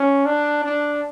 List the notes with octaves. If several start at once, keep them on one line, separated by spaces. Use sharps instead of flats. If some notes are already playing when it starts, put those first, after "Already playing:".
Already playing: C#4
D4
D4